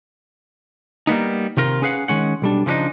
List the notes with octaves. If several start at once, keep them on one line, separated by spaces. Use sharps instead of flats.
G3 A#3 B3 D#4
C3 D#3 F4 A#4
C#4 G#4 B4 F5 F#5
D#3 G#3 C#4 F#5
B1 G3 D4
C#3 F3 A3 D4 D#4